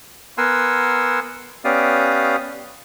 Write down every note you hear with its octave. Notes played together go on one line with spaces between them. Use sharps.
B3 A#4 F#5 G#5 C6 E6
B3 C#4 G4 D5 F5 D#6